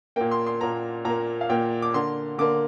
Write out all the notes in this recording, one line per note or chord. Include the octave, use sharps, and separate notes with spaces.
A#2 A#3 G5
C6
C6
A#2 A#3 A#5
A#2 A#3 A#5
F5
A#2 A#3 G5
D6
D3 A#3 C6
D3 A#3 D6